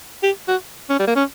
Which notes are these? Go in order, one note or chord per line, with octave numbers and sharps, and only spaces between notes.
G4
F#4
C#4
G3
A#3
C#4